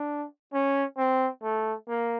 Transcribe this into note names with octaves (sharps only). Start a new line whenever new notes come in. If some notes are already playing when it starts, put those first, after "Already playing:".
Already playing: D4
C#4
C4
A3
A#3